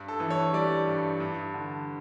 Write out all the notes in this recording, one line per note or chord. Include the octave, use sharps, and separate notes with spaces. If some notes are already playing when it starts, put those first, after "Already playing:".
Already playing: G2
A4
E3
C#5
G3 D5
G2
G2
D3